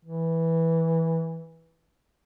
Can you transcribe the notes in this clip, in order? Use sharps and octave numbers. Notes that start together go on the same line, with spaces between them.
E3